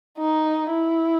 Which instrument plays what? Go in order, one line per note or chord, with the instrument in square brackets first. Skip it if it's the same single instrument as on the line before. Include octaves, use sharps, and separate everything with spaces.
[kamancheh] D#4
E4